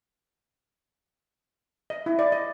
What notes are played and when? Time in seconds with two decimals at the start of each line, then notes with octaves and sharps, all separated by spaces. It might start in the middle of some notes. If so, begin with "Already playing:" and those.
1.90 D#5
2.06 E4
2.19 D5
2.32 D#5